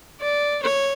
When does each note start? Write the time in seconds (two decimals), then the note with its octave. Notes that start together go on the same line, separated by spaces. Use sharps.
0.21 D5
0.63 C#5